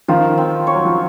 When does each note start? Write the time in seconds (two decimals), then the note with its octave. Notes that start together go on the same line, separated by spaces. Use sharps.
0.08 D#3 F3 F4
0.38 C4
0.67 C#5
0.75 F#3
0.85 F3